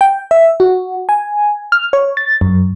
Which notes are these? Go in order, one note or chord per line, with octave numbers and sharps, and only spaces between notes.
G5
E5
F#4
G#5
F6
C#5
A6
F#2